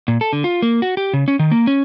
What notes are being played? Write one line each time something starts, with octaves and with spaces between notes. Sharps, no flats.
A#2
A4
D3
F4
A#3
F#4
G4
C#3
C#4
D#3
A#3
C#4